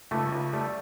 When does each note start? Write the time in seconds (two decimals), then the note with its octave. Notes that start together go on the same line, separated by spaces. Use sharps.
0.11 C#2 A3
0.32 C#2
0.53 G3 A3